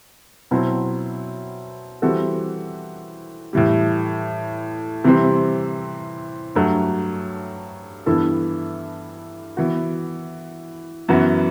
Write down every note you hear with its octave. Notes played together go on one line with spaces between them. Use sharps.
B2 F#3 C4 E4
E3 G3 C4 F#4 A4
A2 E3 G3
C3 E3 G3 C4
G2 F#3 A3
G2 E3 B3 E4 A4
E3 B3 F#4
F#2 E3 B3 F#4